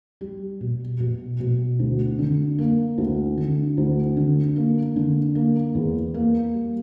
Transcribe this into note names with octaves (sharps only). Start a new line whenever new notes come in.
G3
B2
B2
B2
D2
D3
A#3
D2
D3
D2
D3
A#3
D3
A#3
E2
A#3
G3